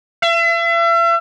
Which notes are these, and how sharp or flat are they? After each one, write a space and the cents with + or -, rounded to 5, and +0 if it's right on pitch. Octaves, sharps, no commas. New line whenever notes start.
E5 +40